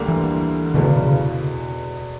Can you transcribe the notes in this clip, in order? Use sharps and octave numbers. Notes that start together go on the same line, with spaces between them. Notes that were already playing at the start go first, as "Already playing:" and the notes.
Already playing: D2 D3 G3 A#3
E3
E2 B2 D3 G#3
C#3
C#3
C#3